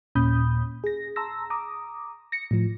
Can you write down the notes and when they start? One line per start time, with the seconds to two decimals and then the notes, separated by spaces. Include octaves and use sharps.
0.15 D#2 A#2 C#4 B5 D#6 G6
0.84 G#4 A#6
1.16 A5 A#5 C6 E6 A#6
1.50 A#5 D6 D#6
2.32 A#6 C#7
2.51 A2 F3